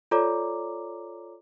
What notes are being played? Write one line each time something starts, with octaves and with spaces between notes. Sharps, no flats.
F4 A4 C#5 D5 A#5 D6